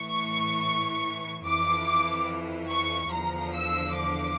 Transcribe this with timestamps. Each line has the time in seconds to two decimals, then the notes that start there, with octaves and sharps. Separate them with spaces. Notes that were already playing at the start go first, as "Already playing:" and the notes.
Already playing: A2 E3 C#6
1.46 F2 E3 D6
2.70 C#6
3.12 E2 D3 F3 A#5
3.55 E6
3.96 D6